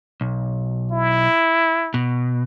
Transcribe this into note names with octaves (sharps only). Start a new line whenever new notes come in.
B1
E4
B2